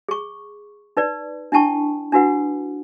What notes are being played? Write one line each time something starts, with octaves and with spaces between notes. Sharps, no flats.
G#4 C#6
D#4 B4 D5
D4 E4 G5 A5 C#6
D4 E4 F#4 B4 F#5